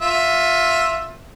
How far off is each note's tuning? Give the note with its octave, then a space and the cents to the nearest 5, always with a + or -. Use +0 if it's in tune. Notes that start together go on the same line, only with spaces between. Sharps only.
F4 +20 E5 +5